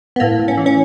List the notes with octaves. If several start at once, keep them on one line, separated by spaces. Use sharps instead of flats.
B3
A2 A#3
A2
C#4
E3
C#4